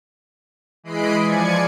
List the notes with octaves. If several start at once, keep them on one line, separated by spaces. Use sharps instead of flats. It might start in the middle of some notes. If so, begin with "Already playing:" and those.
E3 G#3 D#5 B5 C7 D7
F3 D5 G#5 G#6 C#7